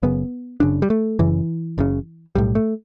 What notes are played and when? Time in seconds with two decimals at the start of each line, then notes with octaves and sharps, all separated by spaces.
0.03 F#1 F#2 C#3 B3
0.60 F#1 F#2 C#3 D4
0.82 G3
0.90 A3
1.19 F#1 F#2 C#3 E3
1.78 F#1 F#2 C#3
2.35 B1 A2 G3
2.55 A3